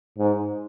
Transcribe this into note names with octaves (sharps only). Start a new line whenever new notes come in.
G#2